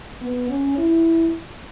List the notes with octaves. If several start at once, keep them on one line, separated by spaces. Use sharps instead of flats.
B3
C#4
E4